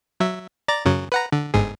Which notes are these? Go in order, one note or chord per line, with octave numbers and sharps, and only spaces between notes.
F#3 E5
D5 A#5 A6
F#2 C#3 F#3
B4 F#5 A#5
D3
G1 G#2 G#4